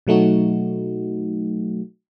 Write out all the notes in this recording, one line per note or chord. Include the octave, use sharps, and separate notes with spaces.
B2 F#3 A3 D#4 F#4